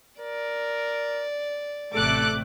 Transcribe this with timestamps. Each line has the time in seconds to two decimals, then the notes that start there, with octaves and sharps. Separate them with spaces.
0.20 A#4 D5
1.94 A1 C3 A3 A4 D6 F#6